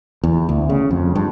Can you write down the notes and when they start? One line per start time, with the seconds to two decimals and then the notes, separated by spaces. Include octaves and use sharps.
0.24 E2
0.49 D2
0.69 C#3
0.91 F2
1.15 G2